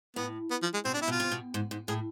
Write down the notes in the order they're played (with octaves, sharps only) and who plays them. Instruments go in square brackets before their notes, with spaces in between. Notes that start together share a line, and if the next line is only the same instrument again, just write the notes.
[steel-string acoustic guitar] A2 [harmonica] B3
[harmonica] B3
F3
G#3
[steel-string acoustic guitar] B2 [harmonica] C4
[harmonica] D4
[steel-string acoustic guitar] C3 [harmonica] E4
[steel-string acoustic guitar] B2 [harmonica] F4
[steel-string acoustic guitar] C3
B2
G#2
G#2
[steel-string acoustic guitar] A2 [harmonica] G#4